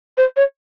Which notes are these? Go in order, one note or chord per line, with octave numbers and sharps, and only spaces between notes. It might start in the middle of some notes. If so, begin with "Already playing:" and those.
C5
C#5